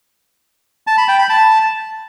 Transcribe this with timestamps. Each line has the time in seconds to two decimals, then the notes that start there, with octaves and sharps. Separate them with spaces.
0.87 A5
0.98 B5
1.08 G5
1.19 B5
1.29 A5